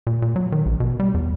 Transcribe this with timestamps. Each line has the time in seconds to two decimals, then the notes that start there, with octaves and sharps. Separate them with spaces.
0.07 A#2
0.22 A#2
0.36 F#3
0.52 D#3
0.66 A#1
0.80 B2
1.00 G3
1.14 E2